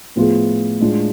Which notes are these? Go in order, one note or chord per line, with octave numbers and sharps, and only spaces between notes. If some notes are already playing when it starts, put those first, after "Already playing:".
A2 F3 B3 F4 G#4
A2 G#3 D4 F4